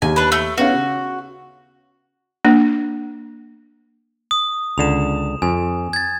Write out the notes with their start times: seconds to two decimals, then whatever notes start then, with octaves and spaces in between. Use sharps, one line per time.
0.02 D#2 G#5
0.16 D4 B4
0.32 A3
0.58 B3 C#4 F#4 F5
0.73 C#3
2.45 A#3 D4
4.31 D#6
4.78 C#2 D3 E7 F7
5.42 F2 G#5
5.93 G#6 A6